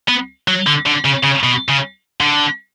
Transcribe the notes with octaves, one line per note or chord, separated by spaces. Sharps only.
B3
F#3
D3
D3
C#3
C#3
B2
C#3
D3